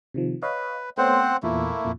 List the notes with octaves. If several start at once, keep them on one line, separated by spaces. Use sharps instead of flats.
C3 D#3 F3
B4 C#5 D#5 F5
A3 B3 C4 C5 C#5 F#5
E2 A#2 E3 A3 A#3 E4
F2 A#2